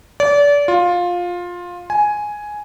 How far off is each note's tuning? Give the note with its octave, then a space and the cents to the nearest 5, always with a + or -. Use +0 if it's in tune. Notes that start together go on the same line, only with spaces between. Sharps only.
D5 -30
F4 +15
G#5 +5